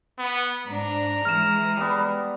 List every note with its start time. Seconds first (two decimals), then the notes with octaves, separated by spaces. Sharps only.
0.19 B3
0.68 G#2 D4 A#5
1.25 E3 G#3 F6 E7
1.77 G3 B3